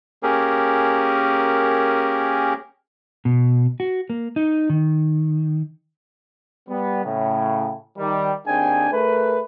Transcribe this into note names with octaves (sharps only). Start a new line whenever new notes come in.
A#3 C#4 G4 G#4 A#4
B2
F#4
A#3
D#4
D#3
G3 B3
A2 C#3
D#3 G3
D#2 C4 D4 G#4 G5 G#5
A3 G#4 A#4 B4